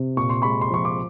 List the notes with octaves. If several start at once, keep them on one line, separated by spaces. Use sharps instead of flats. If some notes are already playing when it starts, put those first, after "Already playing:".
Already playing: C3
A#2 C#6
C6
G#3 B5 C#6
C6
F3 C#6
D6